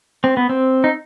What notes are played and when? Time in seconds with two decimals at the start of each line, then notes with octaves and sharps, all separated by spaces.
0.24 C4
0.37 B3
0.49 C4
0.84 D#4